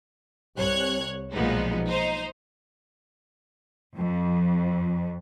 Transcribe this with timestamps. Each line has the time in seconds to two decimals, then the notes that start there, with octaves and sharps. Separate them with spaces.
0.56 C2 C#5 F#6 G#6
1.32 B1 A#2 F3 G#3 B3 D#4
1.87 D#4 C5
3.96 F2